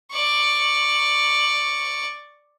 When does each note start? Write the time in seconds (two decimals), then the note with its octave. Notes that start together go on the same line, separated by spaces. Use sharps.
0.11 D5 C#6